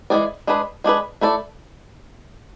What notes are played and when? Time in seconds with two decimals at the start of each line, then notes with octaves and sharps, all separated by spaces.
0.10 E3 G#3 D4 G#4 D5
0.47 G#3 D4 G#4 B4
0.84 G#3 D4 G#4 B4
1.21 A3 E4 A4 D5